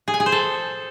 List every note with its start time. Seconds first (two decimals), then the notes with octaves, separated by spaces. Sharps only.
0.08 G#4
0.14 G#5
0.20 G#4
0.26 C5
0.32 A4